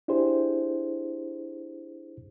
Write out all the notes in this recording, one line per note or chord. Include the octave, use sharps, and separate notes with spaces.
D4 E4 G4 G#4 C5